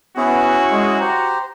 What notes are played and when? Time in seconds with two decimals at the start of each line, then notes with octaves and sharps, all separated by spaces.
0.17 B3 C#4 E4 F#4 G#4
0.71 G#3
1.01 G4 C5 A#5